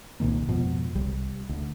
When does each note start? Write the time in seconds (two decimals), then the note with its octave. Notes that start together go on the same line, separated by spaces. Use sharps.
0.20 C2 A#2 D#3 A#3
0.48 F2 G#2 B2 F3
0.95 C2 G3
1.49 D2